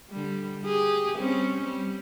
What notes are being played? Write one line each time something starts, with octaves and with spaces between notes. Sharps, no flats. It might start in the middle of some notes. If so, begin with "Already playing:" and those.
D3 G3
G4 G#4
G3 C4 C#4
G3